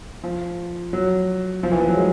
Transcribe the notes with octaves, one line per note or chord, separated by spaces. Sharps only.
F3
F#3
F3
E3
F3
F#3
G#3